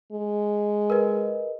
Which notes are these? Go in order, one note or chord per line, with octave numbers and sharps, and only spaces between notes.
G#3
A#4 B4 D#5